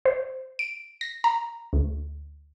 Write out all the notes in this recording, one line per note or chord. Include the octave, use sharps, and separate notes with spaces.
C5
D7
A#6
A#5
D2